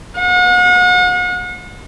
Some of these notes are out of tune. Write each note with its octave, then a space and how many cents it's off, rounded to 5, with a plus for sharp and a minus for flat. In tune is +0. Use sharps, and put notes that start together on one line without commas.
F#5 -40